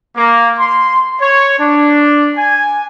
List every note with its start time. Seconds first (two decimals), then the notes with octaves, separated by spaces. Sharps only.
0.17 A#3
0.59 C6
1.21 C#5
1.59 D4
2.37 G#5